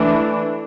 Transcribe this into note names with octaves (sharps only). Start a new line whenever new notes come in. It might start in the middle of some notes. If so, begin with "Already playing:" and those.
Already playing: E3 A3 D4